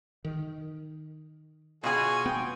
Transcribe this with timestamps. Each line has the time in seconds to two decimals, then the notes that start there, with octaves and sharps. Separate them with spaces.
0.25 D#3
1.84 B2 F4 F#4 G#4 C#5 G#5
2.26 B3 G5